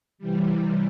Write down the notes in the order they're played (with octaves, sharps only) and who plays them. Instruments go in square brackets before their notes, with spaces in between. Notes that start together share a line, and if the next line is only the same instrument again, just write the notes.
[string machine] C3 E3 G3